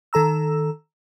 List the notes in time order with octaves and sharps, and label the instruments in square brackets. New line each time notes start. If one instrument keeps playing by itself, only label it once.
[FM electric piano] D#3 A4 A#5 E6